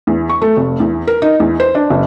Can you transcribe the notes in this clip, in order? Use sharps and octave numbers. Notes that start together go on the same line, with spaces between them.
E2
C#6
A3
F1
E2
A#4
D#4
E2
C5
D4
F#1